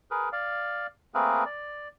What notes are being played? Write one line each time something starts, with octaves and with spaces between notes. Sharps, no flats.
G#4 A#4 B4
D5 F5
A3 A#3 C4 G#4 A#4 B4
D5